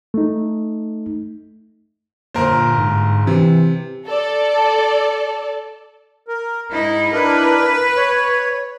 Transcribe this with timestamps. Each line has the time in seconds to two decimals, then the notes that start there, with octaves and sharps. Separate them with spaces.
0.14 A3 D#4
2.34 G1 A#2 A#4 C5
2.78 G#2
3.27 C3 E3
4.06 A4 D5
6.28 A#4
6.71 G#2 D#4 E4
7.12 D4 E4 A#4 B4
7.97 C#5